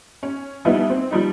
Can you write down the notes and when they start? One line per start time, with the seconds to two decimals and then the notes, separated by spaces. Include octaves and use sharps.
0.23 C#4
0.65 E3 F3 G3 B3 D#4 E4
0.90 C4
1.11 F3 G3 D#4